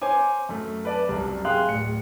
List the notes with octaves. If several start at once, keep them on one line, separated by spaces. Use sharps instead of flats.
C5 C#5 G#5 D6
F#2 A3
B4 D5 A5
C2 F#2
G#4 F5 G5 C6 F#6
D1 C#7